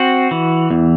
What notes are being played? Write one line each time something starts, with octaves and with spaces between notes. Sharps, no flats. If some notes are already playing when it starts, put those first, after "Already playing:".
Already playing: C4 F#4
E3
E2